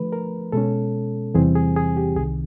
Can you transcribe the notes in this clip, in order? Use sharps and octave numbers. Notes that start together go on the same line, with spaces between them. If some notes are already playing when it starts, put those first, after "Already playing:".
Already playing: D3 F3 A3 B4
A#4
B2 G#3 C#4 A4
E2 C3 E3 G3 C4 G#4
G#4
G#4
G4
C2 C3 D#3 G#4